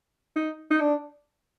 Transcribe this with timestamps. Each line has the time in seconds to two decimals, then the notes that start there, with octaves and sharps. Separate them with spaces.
0.36 D#4
0.71 D#4
0.80 D4